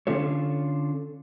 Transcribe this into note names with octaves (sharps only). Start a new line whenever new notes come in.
D3 C#4 D4 F4 A4 C#5